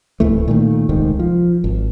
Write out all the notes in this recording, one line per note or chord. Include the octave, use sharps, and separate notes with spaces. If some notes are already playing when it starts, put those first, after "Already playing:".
D1 C2 E3 A3
A#2 D#3 A3
D#1 C2 G#2 D#3
F3
G#1